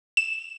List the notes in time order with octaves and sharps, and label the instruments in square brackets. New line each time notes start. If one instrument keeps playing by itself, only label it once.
[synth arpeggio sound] E7